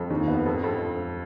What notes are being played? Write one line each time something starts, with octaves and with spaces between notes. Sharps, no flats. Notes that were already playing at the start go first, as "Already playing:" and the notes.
Already playing: F2
D#2
B3
F2
F2